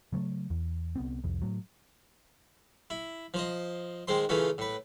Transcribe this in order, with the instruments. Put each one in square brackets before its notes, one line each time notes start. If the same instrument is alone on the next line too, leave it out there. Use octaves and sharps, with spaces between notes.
[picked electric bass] C#3 F#3 G#3 A3
E2
C2 B3 C4
C2 F2
A2 F#3
[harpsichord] E4
F3 C5 D#5
D#3 G#3 C4 C6
C#3 E3 A3 C#4 F4
A2 B4